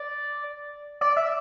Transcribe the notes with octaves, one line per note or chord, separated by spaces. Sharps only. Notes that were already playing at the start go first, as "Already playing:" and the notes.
Already playing: D5
D5
E5